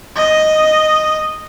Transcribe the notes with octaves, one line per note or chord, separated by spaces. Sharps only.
D#5